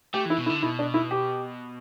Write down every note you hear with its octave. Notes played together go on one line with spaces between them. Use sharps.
A3 G4
E3 E4
B2
E4
D3
B2 E4
D4
E4
G4